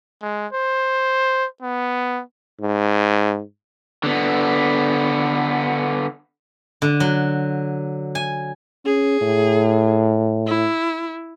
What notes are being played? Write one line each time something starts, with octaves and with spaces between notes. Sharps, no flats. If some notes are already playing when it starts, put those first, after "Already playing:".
G#3
C5
B3
G#2
D3 B3
D3
F#3
G#5
C#4 G#4
A2
E4